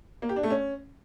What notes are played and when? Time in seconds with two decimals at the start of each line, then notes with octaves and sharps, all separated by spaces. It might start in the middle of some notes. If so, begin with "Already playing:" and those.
0.22 A#3
0.29 G4
0.36 D4
0.43 A3
0.50 C#4